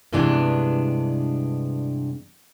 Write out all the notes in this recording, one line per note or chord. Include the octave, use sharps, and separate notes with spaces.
G2 C3 E3 G#3 B3 D4